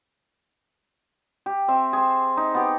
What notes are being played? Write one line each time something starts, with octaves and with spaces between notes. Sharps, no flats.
G4
C4 E5
G#4 C5
D#4
B3 G4